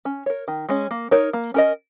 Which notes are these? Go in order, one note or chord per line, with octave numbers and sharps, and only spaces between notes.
C#4
A#4 C#5
D#3
G#3 C#4
A#3
D#4 A#4 C#5
A#3
C#4 A#4 D#5